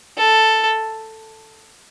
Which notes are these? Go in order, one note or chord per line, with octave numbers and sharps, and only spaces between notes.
A4